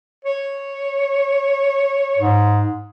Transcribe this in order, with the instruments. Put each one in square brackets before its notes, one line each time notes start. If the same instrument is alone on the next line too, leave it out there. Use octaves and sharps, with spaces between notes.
[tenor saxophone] C#5
[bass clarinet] G#2